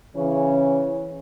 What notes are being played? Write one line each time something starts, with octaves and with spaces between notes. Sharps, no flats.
C#3 E3 C#4